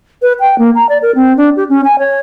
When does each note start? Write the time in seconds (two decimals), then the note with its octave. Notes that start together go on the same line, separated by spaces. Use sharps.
0.22 B4
0.40 G5
0.58 A#3
0.75 A#5
0.89 D5
1.02 A#4
1.15 C4
1.37 D4
1.57 G4
1.69 C#4
1.84 G#5
1.99 C#5